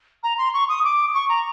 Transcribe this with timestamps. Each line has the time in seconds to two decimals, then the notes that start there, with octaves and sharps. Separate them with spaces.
0.23 A#5
0.38 C6
0.54 C#6
0.69 D#6
0.84 D6
1.14 C#6
1.29 A#5